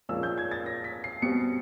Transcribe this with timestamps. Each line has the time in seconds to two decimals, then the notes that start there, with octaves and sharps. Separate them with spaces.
0.09 A#2 F3 G#3 C#4 E6
0.23 G6
0.38 G#6
0.51 A6
0.66 A#6
0.84 B6
1.04 C7
1.22 B2 G3 C4 C#7